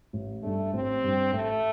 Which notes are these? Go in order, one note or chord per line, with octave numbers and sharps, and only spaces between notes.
A1
G2 G3 A3 D4
A1 C4
G2 G3 D4
A1 A3